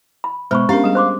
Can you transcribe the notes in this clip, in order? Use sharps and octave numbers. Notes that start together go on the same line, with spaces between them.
B5
B2 G#3 C5 B5 C#6
C#4 D4 G4 A#4 F5
G3 G#4
C5 C6 D6